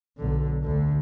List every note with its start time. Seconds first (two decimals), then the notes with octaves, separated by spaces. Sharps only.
0.18 B1 D3
0.63 D2 D3